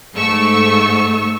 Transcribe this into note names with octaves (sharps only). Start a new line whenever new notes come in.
G#2 A3 C#6 E6